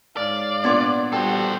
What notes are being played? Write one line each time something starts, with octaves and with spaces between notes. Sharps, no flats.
G#2 C#5 D5 F5 F6
A#2 B3 D4 C6 G#6 A6
G3 F4 F#4 A4 C5 G5